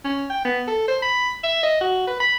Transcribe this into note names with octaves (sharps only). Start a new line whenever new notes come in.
C#4
G5
B3
A4
C5
B5
E5
D#5
F#4
B4
B5